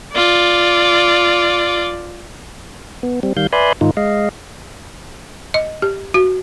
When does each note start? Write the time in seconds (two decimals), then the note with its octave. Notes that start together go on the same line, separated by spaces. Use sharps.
0.13 F4 D5
3.03 B3
3.23 G3 C4
3.37 D#3 G3 F5 G6
3.53 B4 D5 E5 G#5 B5 C6
3.81 G#2 D#3 D#4 F4
3.97 G#3 D#5 F5
5.54 D#5
5.82 G4
6.14 F#4